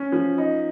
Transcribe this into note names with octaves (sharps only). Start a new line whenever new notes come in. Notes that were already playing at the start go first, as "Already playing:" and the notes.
Already playing: C#4
F3
D#4